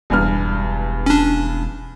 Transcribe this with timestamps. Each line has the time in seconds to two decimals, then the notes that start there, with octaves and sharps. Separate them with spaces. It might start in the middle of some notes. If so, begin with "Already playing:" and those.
0.10 E1 E2 G2 F6
1.06 C#4 D4